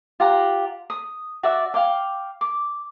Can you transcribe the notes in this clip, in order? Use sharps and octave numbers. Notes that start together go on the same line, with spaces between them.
F4 G4 F#5 A#5
D#6
F#4 D5 E5
F5 G5 D6
D6